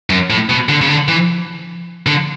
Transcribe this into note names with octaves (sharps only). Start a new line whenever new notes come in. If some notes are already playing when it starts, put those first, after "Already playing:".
F#2
A2
B2
D3
C#3
D3
E3
D3